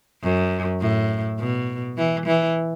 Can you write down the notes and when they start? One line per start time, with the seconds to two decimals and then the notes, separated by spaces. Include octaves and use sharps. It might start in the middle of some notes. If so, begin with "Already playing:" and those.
0.23 F#2
0.81 A2
1.39 B2
1.97 E3
2.26 E3